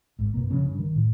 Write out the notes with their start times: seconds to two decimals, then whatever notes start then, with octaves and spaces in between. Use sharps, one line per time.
0.19 G#1 G#2
0.34 F#2 B2 A#3
0.50 C#3 F3 C#4
0.66 G2
0.79 D#3
0.96 A2